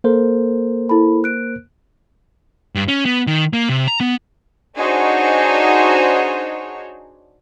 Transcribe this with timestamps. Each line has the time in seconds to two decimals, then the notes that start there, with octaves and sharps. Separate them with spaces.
0.04 A#3 A4 A#4 C5
0.89 E4 A4 B5
1.24 F#6 D7
2.75 G2
2.88 C#4
3.05 B3
3.27 D#3
3.53 A#3
3.69 C3
3.88 A#5
4.00 B3
4.76 D4 D#4 F#4 G#4 C5 C#5